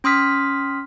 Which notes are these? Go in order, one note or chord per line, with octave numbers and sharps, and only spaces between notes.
C#4 C6 D#6 F6 B6